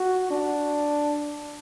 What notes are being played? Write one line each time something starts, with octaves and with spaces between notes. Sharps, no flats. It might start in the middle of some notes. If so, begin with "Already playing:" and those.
Already playing: F#4
D4